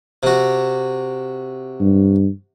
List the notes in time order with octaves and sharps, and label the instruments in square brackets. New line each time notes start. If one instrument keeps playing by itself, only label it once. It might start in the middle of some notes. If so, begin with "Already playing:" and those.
[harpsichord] C3 F#4
[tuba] G2